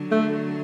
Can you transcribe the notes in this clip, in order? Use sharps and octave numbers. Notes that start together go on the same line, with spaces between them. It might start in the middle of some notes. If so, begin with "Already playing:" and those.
Already playing: D3 F#3
A3